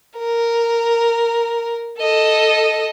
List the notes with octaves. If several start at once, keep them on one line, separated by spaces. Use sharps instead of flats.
A#4
A4 D#5